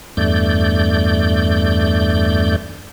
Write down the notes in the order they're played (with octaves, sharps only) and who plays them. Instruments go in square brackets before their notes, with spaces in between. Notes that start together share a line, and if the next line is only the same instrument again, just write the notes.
[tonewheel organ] E2 G2 A3 D5 G6